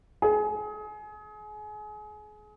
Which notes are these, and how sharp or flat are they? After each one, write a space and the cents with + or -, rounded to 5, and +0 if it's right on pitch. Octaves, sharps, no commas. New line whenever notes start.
G#4 +30